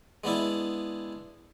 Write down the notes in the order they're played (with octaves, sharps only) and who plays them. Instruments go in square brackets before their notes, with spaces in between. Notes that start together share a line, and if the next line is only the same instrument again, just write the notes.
[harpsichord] G#3 B3 D4 E4